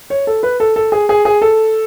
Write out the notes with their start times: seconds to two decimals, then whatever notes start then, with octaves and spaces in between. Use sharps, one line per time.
0.10 C#5
0.27 A4
0.43 B4
0.60 A4
0.76 A4
0.92 G#4
1.09 G#4
1.25 G#4
1.42 A4